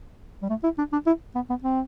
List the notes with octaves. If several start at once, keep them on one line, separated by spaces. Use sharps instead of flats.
G3
A3
E4
D4
D4
E4
B3
B3
C4